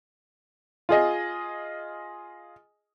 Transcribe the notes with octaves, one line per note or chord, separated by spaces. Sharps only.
F4 G#4 D#5